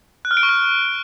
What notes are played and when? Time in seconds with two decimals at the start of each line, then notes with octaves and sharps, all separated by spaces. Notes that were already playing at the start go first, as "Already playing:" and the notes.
0.25 F#6
0.31 F6
0.37 D7
0.43 C#6
0.49 F6